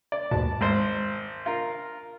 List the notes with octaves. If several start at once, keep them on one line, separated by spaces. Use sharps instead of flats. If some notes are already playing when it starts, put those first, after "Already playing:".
D5
D#2 G#2 B2 A5
G#1 G#3 C5
F4 A#4